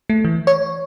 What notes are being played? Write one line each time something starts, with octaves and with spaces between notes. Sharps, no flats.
A3
E3
C#5